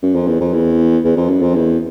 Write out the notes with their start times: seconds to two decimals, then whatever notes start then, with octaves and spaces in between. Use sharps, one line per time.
0.03 F#2
0.15 F2
0.27 E2
0.40 F2
0.53 E2
1.04 E2
1.17 F2
1.29 F#2
1.42 F2
1.54 E2